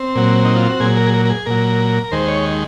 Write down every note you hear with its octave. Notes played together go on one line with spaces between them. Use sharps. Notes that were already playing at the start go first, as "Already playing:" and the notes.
Already playing: C4
A#2 F#3
D#4
F4
F#4
A#2 F#3 G#4
A#4
G#4
A#4
A#4
G#4
A#2 F#3 A#4
D#2 D#3 G#3 C5
C#5